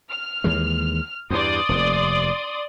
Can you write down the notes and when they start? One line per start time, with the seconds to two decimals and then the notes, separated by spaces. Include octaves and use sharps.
0.11 F6
0.44 D#2 E3 G#3
1.30 E2 G2 D5 C6 D#6
1.69 F1 D#2